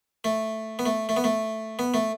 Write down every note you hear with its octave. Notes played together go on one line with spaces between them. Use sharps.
A3
B3
A3
A3
B3
A3
B3
A3